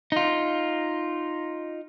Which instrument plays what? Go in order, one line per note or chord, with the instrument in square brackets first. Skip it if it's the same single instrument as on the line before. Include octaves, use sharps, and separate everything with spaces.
[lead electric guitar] D#4 F4